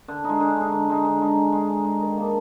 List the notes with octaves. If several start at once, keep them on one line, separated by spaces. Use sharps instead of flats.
D3
G#3 D#4
D3
G#3 D#4
D3
G#3 D#4
D3
G#3 D#4
D3
G#3 D#4
D3
G#3 D#4
D#3
A#3 D4